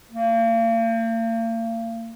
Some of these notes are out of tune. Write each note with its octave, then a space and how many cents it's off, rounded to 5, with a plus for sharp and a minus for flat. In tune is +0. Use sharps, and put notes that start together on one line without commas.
A#3 -40